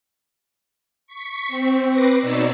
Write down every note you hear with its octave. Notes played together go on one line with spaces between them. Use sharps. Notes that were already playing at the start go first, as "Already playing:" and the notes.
C#6 B6
C4
B4 D6 A#6 C7
B2 D#4 C#5 D5 B5 E6